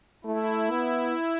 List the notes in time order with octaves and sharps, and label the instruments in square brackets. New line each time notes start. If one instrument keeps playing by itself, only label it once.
[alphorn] A3 [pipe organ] E4
[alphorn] B3